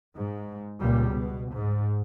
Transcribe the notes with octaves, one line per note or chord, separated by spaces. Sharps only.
G#2
C#2 A#2 G3
B2
G#2